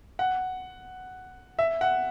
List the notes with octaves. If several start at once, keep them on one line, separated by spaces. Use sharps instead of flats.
F#5
E5
F#5